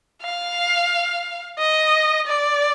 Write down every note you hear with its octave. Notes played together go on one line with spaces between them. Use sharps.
F5
D#5
D5